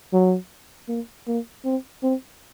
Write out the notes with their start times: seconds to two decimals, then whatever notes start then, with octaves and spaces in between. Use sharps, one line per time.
0.13 F#3
0.89 A#3
1.27 A#3
1.65 C4
2.03 C4